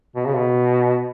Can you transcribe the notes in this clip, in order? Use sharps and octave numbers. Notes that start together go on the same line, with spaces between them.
B2
C#3
B2